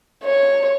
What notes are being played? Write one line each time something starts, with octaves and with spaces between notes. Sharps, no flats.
C#5